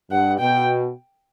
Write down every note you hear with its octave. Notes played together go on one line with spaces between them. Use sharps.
G2 F#5
B2 G5